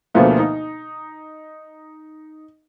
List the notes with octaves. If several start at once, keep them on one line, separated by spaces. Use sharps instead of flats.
D2 B2 F3 A3 A#3
D#4